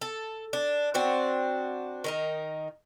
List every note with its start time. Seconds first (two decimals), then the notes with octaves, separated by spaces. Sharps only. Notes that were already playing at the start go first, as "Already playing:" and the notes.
0.01 A4
0.53 D4
0.94 C4 D4 F#4
2.04 D#3 D#4 A#4